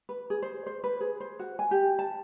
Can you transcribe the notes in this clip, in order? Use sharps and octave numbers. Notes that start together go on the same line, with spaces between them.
B4
G#4
C5
C5
B4
G#4
C5
F#4
G#5
G4
A5